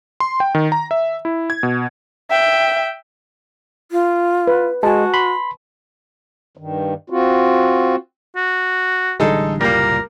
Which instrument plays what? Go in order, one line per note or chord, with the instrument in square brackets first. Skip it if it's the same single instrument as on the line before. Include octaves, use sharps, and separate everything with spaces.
[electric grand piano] C6
G5
D#3
A#5
E5
E4
G#6
B2
[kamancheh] E5 G5
[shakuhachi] F4
[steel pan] B4
[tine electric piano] G#3 [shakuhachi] F#4 [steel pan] G#5 A5
[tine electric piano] B5 C6
[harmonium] G2 D#3
C4 F4 F#4
[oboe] F#4
[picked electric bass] A1 D3 G3 [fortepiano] G#3 D#4 A4
[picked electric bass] F#1 C2 A#2 [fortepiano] G3 A#3 [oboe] A#4